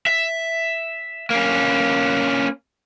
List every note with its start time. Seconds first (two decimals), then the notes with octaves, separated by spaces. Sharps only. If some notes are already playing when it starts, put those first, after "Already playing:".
0.07 E5
1.30 A#3 C#4